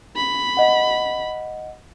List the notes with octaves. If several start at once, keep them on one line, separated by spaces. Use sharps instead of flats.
B5
D#5 F#5